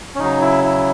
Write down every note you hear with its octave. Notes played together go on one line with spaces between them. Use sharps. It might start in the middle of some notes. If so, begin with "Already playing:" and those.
C#4
C#3 F#3 D#4
E4
E4